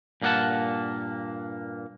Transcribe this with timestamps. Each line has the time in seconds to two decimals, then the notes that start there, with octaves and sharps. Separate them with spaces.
0.22 G2 A#2 A#3 D4 F#5 A5